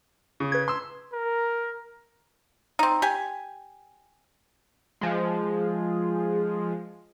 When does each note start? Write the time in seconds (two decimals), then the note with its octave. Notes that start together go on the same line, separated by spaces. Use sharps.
0.40 C#3
0.52 B4 G#6
0.68 C6 E6
1.13 A#4
2.79 C4 D#4
3.02 G4 G#5
5.01 F3 G#3